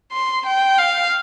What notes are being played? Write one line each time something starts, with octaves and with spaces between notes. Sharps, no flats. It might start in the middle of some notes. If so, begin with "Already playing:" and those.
C6
G5
F5